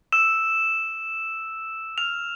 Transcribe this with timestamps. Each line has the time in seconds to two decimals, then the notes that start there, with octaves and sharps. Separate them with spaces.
0.12 E6 E7
1.98 F6 F7